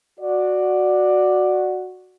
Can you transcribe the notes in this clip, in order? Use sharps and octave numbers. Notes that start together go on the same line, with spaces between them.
F#4 D5